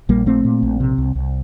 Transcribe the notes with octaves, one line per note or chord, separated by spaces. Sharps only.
A#1 G3 A#3
A#2 A3 C4
A#2
A#1
C3
C2
C2